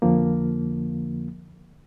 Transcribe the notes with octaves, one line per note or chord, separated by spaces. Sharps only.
F2 D3 F3 A#3